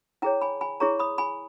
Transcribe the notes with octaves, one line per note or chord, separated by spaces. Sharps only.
E4 G#4 C#5 G5 A#5
G#5 B5
G#5 B5
E4 G#4 C#5 A#5 C#6
B5 D#6
G#5 B5